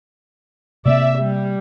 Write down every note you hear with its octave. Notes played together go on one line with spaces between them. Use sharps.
C3 A#3 C4 D5 E5
G3